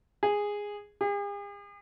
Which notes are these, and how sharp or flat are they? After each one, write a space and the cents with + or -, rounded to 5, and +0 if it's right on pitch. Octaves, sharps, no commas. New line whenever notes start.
G#4 -10
G#4 -45